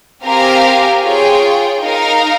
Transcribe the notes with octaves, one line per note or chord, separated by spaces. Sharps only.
C4 G4 A#4 F5 G#5
F4 G#4 C#5 G5
D#4 A#4 F5